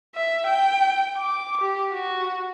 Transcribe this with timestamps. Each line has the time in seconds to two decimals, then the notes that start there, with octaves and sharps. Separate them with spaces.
0.15 E5
0.47 G5
1.16 D6
1.61 G4
1.93 F#4